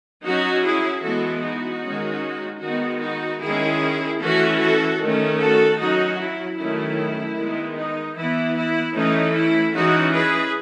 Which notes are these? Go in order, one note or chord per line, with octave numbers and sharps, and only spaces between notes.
F#3 C#4 D#4 F#4
E4 G#4
E3 G#3 B3 F#4 A4
D#4 F#4
D#3 G#3 C#4
D#3 G#3 B3 D#4 F#4
D#4 F#4
D#3 G#3 C#4 E4 G#4
E3 A3 C#4 F#4 A4
F#4 A4
D#3 A3 C#4
F#4 A4
F#3 C#4 D#4 F#4
E4
D#3 F#3 A3 C#4 E4
D#3 G#3 B3
D#4
E3 B3 E4
E4
E3 A3 C#4 D#4
E4
E3 G#3 C#4 D#4 F#4
G#4 B4